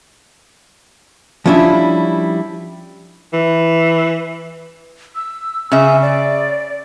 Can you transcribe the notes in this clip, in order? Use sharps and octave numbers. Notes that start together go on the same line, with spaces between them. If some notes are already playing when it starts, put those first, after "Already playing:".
F3 G3 C#4 D4 E4
E3
E6
C#3 E5 G#5
D5